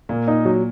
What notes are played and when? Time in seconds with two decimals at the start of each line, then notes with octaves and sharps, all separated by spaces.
0.09 A#2 A#3
0.28 D#4
0.45 F#3